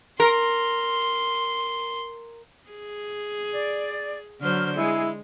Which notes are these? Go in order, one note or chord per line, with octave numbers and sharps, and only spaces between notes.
A#4 C6
G#4
D5
D3 F#3 C5 F6
G#3 E4 G#4